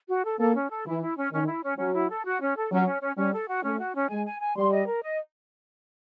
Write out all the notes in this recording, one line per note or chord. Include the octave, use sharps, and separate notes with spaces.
F#4
A4
A#3 A4
C#4
A4
E3 E4
E4
C#4
D#3 C#4
E4
C#4
F#3 C#4
E4
A4
F#4
C#4
A4
F#3 C#4
C#4
C#4
G3 C#4
A4
F#4
A3 C#4
F#4
C#4
G#3 G#5
G#5
G#5
G3 C6
D#5
A#4
D#5